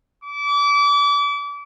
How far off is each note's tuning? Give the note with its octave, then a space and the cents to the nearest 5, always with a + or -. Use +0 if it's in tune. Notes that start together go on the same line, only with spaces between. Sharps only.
D6 -35